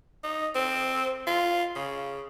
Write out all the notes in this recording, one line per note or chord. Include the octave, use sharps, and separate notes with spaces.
D#4
C4
F4
C#3